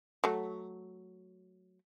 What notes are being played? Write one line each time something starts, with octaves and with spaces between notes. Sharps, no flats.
F#3 A3